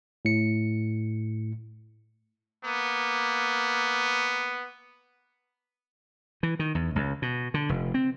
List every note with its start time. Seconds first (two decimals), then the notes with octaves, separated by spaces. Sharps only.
0.25 A2 C#7
2.64 A#3 B3
6.43 E3
6.59 D#3
6.75 E2
6.96 C#2
7.22 B2
7.54 D3
7.69 F1
7.94 C4